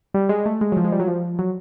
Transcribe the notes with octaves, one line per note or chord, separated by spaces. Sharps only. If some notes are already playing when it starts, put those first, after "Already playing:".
G3
G#3
A3
G#3
F#3
F3
G#3
G3
F#3
F3
F#3